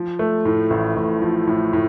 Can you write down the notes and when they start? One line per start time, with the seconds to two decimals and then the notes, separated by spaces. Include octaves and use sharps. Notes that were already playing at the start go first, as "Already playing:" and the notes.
Already playing: F3
0.19 A3
0.45 A2
0.70 A1
0.96 A1
1.22 F3
1.47 A2
1.73 A2